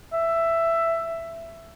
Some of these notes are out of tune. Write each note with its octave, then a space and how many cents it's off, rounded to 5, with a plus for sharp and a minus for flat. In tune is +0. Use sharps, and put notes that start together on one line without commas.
E5 +10